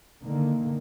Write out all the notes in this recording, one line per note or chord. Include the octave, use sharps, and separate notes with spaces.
D3 D#3 A#3